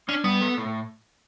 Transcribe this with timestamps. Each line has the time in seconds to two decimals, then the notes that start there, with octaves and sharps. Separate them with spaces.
0.09 C#4 D4
0.24 G3 B3
0.41 A4
0.57 A2